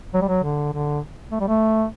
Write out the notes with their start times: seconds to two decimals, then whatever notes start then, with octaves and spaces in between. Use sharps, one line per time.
0.14 F#3
0.22 G3
0.28 F#3
0.43 D3
0.73 D3
1.32 A3
1.40 G3
1.48 A3